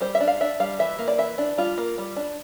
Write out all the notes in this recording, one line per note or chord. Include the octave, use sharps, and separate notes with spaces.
G3 C5
E5
D4
F5
D4 E5
G3 F5
E3 E5
A#3
D5
E3 E5
D4
G3 F4
A#3
G3
D4